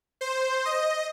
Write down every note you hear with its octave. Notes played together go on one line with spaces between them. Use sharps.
C5
D#5